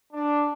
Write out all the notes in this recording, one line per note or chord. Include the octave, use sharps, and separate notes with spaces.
D4